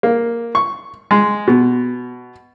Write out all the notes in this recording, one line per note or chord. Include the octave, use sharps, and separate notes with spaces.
A#3
C#6
G#3
B2